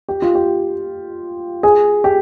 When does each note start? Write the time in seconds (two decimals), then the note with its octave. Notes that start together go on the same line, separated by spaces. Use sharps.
0.09 G4
0.22 F4
0.35 G4
1.63 G#4
2.04 G4